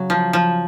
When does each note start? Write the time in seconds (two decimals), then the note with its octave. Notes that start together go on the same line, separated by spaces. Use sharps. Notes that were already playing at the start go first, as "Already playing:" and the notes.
Already playing: C#3 F#3
0.10 F3
0.33 F3